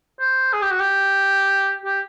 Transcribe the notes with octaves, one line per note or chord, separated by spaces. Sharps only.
C5
G#4
G4
F#4
G4
G4